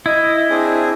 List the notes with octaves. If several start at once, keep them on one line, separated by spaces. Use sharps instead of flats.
E4 D#5
C4 D4 G#4